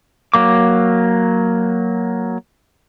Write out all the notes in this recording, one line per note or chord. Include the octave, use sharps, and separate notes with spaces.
F#3 A#3 D6